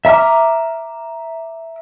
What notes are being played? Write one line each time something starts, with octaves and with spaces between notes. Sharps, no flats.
E5 A#5 D6 F6